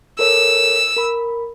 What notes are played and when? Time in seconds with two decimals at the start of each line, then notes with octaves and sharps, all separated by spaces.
0.19 A4 A#4 C#5 E6
0.96 A#4 B5